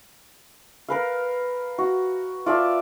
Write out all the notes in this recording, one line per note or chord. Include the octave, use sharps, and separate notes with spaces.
A#4 B4 F5
F#4
F4 D5 E5 A5